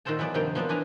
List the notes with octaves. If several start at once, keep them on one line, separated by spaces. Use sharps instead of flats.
A#2 D#3 F#4 A4 C5 A5
E3 F#3 B3 B4 D5
G2 C3 D#3 F3 A#3 G5
F3 F#3 B3 C4 D4
E3 D4 B4 G#5 A#5